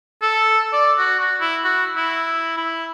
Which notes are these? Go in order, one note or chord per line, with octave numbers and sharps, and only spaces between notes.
A4
D5
F#4
F#4
E4
F#4
E4
E4